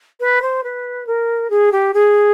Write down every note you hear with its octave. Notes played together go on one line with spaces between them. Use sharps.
B4
C5
B4
A#4
G#4
G4
G#4